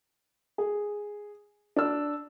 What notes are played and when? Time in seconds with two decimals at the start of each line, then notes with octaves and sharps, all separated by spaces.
0.58 G#4
1.76 D4 E6